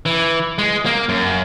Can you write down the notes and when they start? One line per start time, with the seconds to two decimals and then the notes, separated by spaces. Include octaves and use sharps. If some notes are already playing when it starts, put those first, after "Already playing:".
0.06 E3
0.58 G#3
0.86 A#3
1.09 F#2